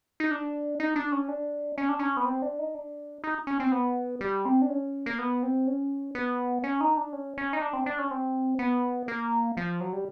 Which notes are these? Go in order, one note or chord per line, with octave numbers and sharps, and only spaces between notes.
D#4
D4
D#4
D4
C#4
D4
C#4
D4
C#4
B3
C4
D4
D#4
D4
D#4
C#4
C4
B3
G3
C4
D4
C#4
A#3
B3
C4
C#4
B3
C#4
D#4
D4
C#4
C#4
D#4
D4
C4
D4
C#4
C4
B3
A#3
F3
F#3
G3